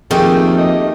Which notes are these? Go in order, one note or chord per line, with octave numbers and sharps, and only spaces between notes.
F2 D#3 A3 A#3 G4 G#4
D#5